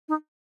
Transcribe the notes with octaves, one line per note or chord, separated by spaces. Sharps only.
D#4